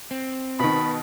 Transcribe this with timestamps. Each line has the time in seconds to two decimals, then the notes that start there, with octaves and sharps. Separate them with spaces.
0.11 C4
0.59 B2 D#3 B5